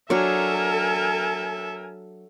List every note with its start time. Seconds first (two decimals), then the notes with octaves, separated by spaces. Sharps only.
0.10 F#3 D4 A4 A#4 C#5 E5 G#5